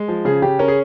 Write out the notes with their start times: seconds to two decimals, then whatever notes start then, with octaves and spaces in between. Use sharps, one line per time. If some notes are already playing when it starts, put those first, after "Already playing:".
Already playing: G#3
0.08 F3
0.25 C#3 G#4
0.42 C#3 G4
0.59 C#4 A#4
0.68 G#4